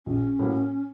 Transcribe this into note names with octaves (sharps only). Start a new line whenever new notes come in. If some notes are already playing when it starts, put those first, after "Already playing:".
A#1 C#4
A2 F#3 A#3